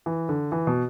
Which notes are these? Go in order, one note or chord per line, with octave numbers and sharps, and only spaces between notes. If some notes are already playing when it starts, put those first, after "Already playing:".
E3
D3
E3
B2